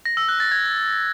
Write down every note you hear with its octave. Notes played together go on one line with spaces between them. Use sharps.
A#6
E6
F#6
A6
G#6